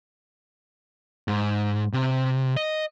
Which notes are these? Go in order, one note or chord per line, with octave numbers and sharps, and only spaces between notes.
G#2
C3
D#5